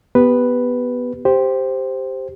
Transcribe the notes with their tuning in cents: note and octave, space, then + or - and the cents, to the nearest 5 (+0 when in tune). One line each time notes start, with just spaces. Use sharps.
B3 +0 G4 +0 B4 +0
G4 +0 C5 +0